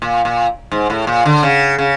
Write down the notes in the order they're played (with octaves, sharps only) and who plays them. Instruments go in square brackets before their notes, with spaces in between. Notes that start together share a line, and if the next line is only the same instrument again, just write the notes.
[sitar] A#2
A#2
G#2
A2
A#2
D3
C#3
C#3